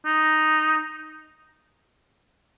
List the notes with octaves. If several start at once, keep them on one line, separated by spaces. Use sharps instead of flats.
D#4